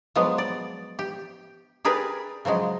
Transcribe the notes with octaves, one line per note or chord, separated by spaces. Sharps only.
F3 F#3 G#3 B3
D5
G4
G4 G#4 A#4 B4 D5
C#3 F3 F#3 G#3